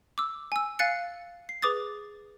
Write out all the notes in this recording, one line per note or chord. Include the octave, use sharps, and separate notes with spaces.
D6 E6
G#5 E6
F5 G#5 F#6 A6 C#7
C7
G#4 B4 D6 D#6 A6